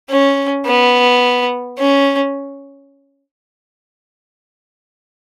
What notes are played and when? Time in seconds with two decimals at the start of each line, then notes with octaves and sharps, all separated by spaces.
0.09 C#4
0.65 B3
1.78 C#4